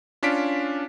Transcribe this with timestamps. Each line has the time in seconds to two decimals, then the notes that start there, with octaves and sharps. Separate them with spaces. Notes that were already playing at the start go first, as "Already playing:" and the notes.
0.23 C#4 D4 F4 F5 B6 D7